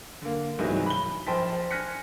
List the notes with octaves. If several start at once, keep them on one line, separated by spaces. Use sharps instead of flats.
D3 A#3
C2 G#2 E3 F#3
B5 G7
A#1 C5 G5 A5 C6 B6
G#5 F6 F#6 A#6 B6 C#7